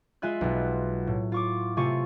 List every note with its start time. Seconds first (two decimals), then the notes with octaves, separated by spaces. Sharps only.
0.22 G#3 F4 E5 G#5 F#6
0.41 B1 B2
1.07 A2
1.32 F4 C#6 D6
1.77 C3 A3 F4 G#5 C#6 C#7